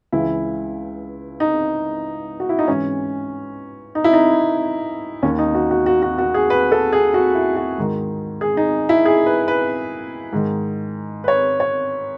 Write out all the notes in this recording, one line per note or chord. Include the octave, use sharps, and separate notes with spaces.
C#2 C#3 E3 E4
D#4
F#4
E4
D#4
G#2 E3 C#4
D#4
E4
D#4
D#2 D#3 C#4
D#4
F#4
F#4
F#4
F#4
F#4
G#4
B4
A4
G#4
F#4
E4
F#4
G#2 D#3
G#4
D#4
E4
G#4
B4
B4
G#2 D#3
B4
C#5
C#5